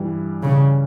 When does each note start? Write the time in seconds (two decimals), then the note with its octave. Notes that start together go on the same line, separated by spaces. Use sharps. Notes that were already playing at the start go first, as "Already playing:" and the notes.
Already playing: G2 E3 G3
0.43 C#3